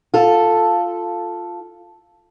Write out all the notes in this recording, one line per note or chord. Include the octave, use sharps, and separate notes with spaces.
F4 A4